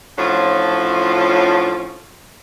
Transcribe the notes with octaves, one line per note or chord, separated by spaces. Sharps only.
A2 F3 F#3 C#4 D4 F4